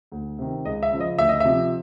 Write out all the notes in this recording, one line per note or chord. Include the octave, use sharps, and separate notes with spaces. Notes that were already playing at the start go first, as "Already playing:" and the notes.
D2
C3 D#3
C#2 D#5
E5
C#3 F3
D#5
D2 E5
D#5
C3 F3 E5